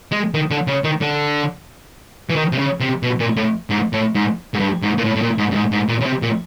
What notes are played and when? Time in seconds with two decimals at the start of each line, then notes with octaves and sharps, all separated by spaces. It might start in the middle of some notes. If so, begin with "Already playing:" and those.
0.12 G#3
0.34 D#3
0.51 D3
0.67 C#3
0.84 D#3
1.01 D3
2.30 E3
2.36 D#3
2.52 C3
2.58 C#3
2.80 C3
3.03 B2
3.20 A#2
3.37 A2
3.70 G#2
3.93 A2
4.15 G#2
4.54 G#2
4.60 G2
4.82 G#2
4.98 A#2
5.05 A2
5.16 A2
5.22 A#2
5.38 G#2
5.51 G2
5.55 G#2
5.72 G#2
5.89 A#2
6.01 C#3
6.06 C3
6.22 A#2